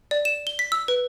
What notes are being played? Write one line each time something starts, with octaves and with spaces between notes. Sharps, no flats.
D5
E7
G7
B6
E6
B4